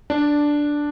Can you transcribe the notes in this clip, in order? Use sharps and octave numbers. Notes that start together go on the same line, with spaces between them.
D4